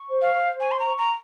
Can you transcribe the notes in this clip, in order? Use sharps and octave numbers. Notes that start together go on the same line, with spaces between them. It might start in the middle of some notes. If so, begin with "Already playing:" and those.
Already playing: C#6
C5
F5
C5
G#5 C#6
C6
A#5
C#6
A#5